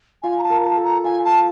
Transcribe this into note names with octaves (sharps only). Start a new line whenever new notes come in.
F4 G#5
A#5
A5
A#4
A#4 A5
A4
A#5
F4 G#5
A5